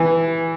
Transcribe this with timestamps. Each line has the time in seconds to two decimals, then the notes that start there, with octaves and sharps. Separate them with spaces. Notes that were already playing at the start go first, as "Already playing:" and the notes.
Already playing: E3